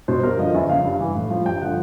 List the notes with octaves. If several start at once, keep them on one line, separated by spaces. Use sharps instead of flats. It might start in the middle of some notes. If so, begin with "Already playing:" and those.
B2 C5
G2 A#4
D3 F3 D#5
E2 E5
C#3 F3 F5
G2
E3
A2
F3
G2 G5
D3 F3 F#5